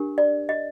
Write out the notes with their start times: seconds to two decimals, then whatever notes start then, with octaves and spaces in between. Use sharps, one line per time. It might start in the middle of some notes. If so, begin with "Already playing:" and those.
Already playing: D4 G4 A#4
0.18 D5
0.49 D#5